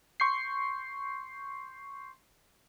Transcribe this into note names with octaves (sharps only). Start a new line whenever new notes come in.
C6 C#6 G6 C7